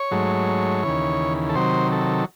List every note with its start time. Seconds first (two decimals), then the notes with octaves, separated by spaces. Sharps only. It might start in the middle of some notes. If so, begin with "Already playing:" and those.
Already playing: C#5
0.11 G#2 F#3 A3
0.83 D#2 C#3 E3
1.49 A4
1.55 C3 D#3 F#3 C5
1.92 A4